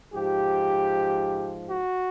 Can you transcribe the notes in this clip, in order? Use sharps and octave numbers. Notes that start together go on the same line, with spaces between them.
G#2 F3 G4
F#4